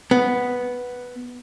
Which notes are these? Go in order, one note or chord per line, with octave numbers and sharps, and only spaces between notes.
B3